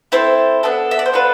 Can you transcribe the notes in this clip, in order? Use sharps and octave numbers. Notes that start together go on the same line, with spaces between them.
C4 E4 A4 C5
B3 D4 A4
E5
D5
C5
B3 D4 F4 A4 B4